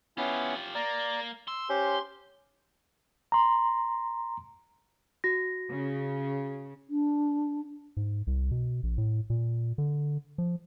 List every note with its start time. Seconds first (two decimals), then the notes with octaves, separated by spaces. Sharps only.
0.17 B3 C#4 E4 F4 G4
0.75 A#3 D5 A#5
1.48 C6 E6
1.69 C#4 G4 C5
3.32 A#5 C6
5.24 F#4 A#6
5.70 C#3
6.90 D4
7.97 G#2
8.27 C2
8.51 B2
8.83 A#1
8.98 A2
9.30 A#2
9.78 D3
10.38 F3